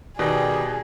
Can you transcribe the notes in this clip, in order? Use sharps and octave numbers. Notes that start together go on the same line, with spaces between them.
B2 D#3 G3 G#4